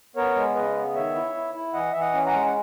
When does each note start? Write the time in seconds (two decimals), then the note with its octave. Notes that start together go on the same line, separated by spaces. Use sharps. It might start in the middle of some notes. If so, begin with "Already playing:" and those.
0.16 B3 A#4 C#5
0.36 G#3
0.56 C#3 B4 D#5
0.76 B3
0.95 D#3 C#5 E5
1.15 E4
1.35 E4
1.54 E4
1.73 E3 D#5 F#5
1.92 E3 E5
2.00 D#5 F#5
2.13 C#4
2.26 F#5 A#5
2.33 G#3
2.46 F#5